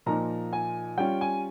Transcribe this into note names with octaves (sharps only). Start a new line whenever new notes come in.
A#2 F3 A#3 D#4 A#5
G#5
G3 C#4 F4 G5
G#5